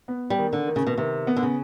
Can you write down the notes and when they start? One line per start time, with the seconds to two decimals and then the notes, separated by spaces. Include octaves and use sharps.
0.08 B3
0.30 G3
0.38 D#3
0.53 D3
0.68 D#3
0.76 C#3
0.87 B2
0.97 C3 D#3
1.27 B3
1.36 D3
1.43 C#3